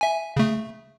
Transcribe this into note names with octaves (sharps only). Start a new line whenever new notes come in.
E5 G#5
C#3 A3